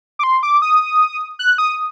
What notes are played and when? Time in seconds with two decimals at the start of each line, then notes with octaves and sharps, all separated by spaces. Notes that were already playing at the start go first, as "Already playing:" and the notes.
0.19 D6
0.23 C6
0.43 D6
0.62 D#6
1.39 F#6
1.58 D#6